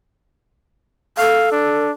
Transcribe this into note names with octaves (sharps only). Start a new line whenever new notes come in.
A4 F5
D4